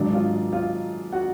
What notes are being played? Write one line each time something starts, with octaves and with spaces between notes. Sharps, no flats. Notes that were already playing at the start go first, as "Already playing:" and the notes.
Already playing: G#1 G#2 D#3 F#3 D4 D5
F4 F5
F4 F5
F#4 F#5